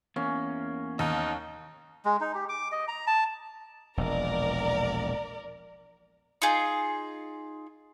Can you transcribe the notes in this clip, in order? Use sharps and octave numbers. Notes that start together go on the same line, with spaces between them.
E2 A#3 C#4
D#2 D#4
G#3
D#4
G4
D6
D#5
A#5
A5
E1 A#1 A#4 D5
D#4 F4 G#4